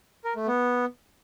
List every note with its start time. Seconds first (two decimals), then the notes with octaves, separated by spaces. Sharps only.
0.24 A#4
0.36 A3
0.47 B3